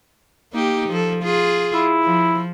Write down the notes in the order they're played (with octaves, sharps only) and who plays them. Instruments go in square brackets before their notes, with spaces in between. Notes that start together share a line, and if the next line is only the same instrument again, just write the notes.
[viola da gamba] A#3 D#4 G4
F3 A4
F4 G#4
[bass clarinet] E4
[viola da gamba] F3